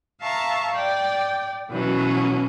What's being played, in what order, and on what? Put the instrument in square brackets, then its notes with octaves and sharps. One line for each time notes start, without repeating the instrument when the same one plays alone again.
[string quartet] E5 F5 A5 A#5 C#6
D5 G5
B2 E3 F#3 C#4